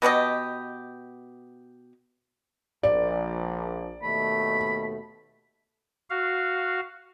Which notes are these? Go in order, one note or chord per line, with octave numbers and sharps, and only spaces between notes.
B2 B3 G4 D#5
A#1 D5
D#2 B2 A3 B5
F#4 F5